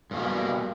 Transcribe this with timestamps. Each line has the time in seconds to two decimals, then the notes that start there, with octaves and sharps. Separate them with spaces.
0.11 G2
0.14 B2
0.16 A#3
0.19 G3